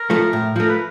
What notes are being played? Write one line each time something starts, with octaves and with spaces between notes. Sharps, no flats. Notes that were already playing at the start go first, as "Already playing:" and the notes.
Already playing: A#4
F3 A3
A2
F3 A3 A#4
B4